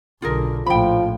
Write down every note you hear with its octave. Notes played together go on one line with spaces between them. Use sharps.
B1 D3 F4 G#4 A#4
A#1 A2 F3 G5 B5